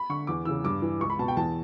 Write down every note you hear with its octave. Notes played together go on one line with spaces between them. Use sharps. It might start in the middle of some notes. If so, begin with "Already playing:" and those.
Already playing: B5
D3 C#6
E2 D6
C#3 E3 E6
G2 D6
E3
C#2 C#6
B5
B2 A5
G5
E2 A5